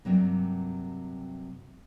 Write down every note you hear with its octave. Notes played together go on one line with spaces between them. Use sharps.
G2 C3 F#3 A#3